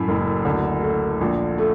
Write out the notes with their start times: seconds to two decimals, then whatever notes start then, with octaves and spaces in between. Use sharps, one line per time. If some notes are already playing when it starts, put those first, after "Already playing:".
Already playing: F#2 A2
0.08 F#1
0.45 D2
0.83 A3
1.21 A#1
1.58 A3